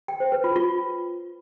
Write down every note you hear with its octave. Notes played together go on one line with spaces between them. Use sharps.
G5
C5
B4
F4
F4